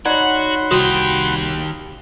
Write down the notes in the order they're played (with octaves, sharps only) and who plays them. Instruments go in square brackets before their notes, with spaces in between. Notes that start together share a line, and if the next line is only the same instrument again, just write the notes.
[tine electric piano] D#4 C#5 [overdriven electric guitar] F#4 [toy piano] D5 [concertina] F#5 B5 C6
[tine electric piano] C2 D#6 [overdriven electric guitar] D#3 G4 [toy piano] F#4